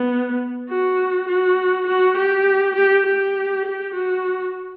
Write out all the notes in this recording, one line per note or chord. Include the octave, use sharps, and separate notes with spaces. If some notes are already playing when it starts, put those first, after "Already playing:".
Already playing: B3
F#4
F#4
F#4
G4
G4
G4
G4
F#4